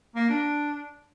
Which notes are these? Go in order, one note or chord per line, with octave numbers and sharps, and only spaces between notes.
A#3
D4